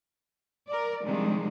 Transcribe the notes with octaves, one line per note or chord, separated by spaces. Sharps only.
A#4 D5
C3 D#3 F3 G3 G#3 D4